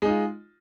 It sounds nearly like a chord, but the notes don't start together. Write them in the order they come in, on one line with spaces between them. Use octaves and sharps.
G#3 D#4 F4